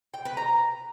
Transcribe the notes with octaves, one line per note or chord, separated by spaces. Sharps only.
G5
B4
A#5